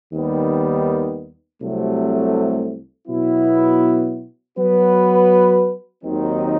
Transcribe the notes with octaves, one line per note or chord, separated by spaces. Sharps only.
D#2 D#3 G3 B3
C2 C3 F#3 A3
B2 F#3 B3 E4
F#3 B3 F#4 B4
D#2 D#3 F#3 C4 D#4